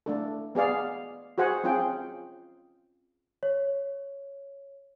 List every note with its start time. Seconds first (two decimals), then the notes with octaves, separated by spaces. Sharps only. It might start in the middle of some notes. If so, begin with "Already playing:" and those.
0.06 A3 D4 A4
0.55 B3 G#4 D5 F5
1.38 F#4 G#4 C5 F#5 G#5
1.64 C4 C#4 F4 G#4 G5
3.43 C#5